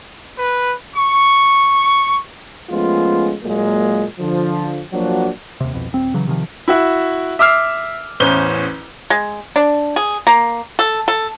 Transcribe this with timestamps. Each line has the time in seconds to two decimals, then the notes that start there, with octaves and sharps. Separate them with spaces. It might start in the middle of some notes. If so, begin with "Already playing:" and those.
0.38 B4
0.96 C#6
2.70 F3 G#3 A3 B3 C#4 F4
3.43 A#2 F#3 G#3 A#3
4.19 D3 F3
4.92 F3 F#3 A#3 D4 F#4
5.60 D#2 C3
5.73 C2 F2 B2
5.93 D#1 C4
6.14 C#3 E3 F#3
6.27 C3 D#3 F3
6.68 E4 F#4 E5
7.39 E5 D6 E6 F6 C7
8.20 A1 E2 C#4 C5 G7
9.10 G#3
9.56 D4
9.96 G#4
10.27 A#3
10.79 A4
11.08 A4